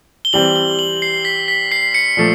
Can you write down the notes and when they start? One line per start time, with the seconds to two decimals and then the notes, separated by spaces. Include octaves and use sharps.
0.25 G7
0.33 E3 G3 C4 F#7
0.56 G7
0.79 F#7
1.02 C7
1.25 B6
1.48 B6
1.71 C7
1.94 C#7
2.17 A#2 F3 A3